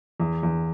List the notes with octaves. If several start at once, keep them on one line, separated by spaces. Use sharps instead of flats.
E2
E2